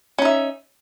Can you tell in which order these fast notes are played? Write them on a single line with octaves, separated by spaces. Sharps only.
C#4 D#4 E5